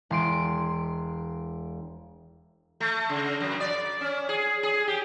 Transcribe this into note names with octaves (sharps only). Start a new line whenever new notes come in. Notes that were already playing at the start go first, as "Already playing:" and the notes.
E1 C6 D7
A3
C#3
F#2
D5
C#4
G#4
G#4
G4